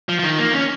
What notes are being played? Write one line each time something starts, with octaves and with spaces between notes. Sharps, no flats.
F3
F3
D#3
A#3
C#4